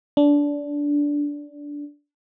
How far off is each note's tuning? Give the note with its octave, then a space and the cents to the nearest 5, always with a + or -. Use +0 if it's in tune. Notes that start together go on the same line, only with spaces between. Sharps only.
D4 -20